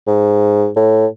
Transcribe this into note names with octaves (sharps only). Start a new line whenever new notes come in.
G#2
A2